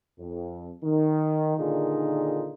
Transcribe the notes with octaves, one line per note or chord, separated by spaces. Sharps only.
F2
D#3
A#2 D3 D#3 D#4 F4 G#4